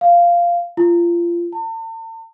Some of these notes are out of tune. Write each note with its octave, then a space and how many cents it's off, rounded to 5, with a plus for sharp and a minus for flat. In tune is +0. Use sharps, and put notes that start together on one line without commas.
F5 -10
F4 -25
A5 +45